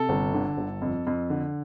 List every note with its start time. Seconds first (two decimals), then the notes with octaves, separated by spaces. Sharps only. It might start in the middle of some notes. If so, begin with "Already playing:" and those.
Already playing: C3 A4
0.09 G1
0.34 D3
0.57 G1
0.82 F2
1.07 F2
1.30 D3